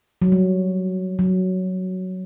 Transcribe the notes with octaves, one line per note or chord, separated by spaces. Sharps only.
F#3
G3
F#3